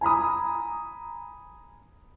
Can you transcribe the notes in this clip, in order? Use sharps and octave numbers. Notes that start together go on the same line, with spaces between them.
G#5 A#5 B5 D#6